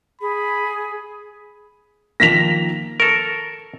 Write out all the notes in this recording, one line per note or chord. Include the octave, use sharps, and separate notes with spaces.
G#4 B5
D#3 F3 A#3 A#6 B6 F7
A4 A#4 C#6